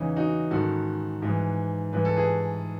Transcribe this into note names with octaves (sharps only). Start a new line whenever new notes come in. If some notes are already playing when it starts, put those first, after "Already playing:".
Already playing: E2 C#3 E3 D#4
D#4 F#4
G#2 D#3 F#4 A4
G#2
E3
G#2 E3 B4
A4
G#4 B4